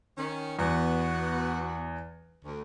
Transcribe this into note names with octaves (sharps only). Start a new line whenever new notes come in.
D#3 C#4
E2 B3 F#4
D2